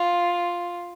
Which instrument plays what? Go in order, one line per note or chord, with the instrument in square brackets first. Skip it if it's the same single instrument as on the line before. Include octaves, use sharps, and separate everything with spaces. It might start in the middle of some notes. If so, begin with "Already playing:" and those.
Already playing: [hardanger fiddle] F4